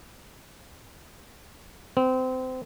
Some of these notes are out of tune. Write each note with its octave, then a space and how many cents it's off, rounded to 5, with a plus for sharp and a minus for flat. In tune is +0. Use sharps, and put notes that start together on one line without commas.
C4 -25